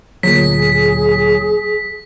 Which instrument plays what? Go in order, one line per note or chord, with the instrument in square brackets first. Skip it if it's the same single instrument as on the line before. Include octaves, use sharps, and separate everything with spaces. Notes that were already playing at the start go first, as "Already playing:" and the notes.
[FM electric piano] D2 A#2 [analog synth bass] F#3 [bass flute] G#4 [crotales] B6